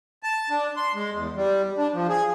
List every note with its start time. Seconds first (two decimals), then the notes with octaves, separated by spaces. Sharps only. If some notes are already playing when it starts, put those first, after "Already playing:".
0.23 A5
0.50 D4
0.77 C6
0.95 G#3
1.13 E2
1.36 G3
1.78 D4
1.94 F3
2.09 G#4